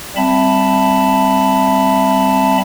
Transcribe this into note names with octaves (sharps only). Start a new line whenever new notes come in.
G3 C4 E5 A5 B5